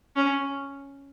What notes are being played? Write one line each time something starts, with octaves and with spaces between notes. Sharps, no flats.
C#4